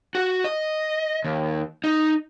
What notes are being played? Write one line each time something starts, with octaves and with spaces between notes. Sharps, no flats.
F#4
D#5
D#2
D#4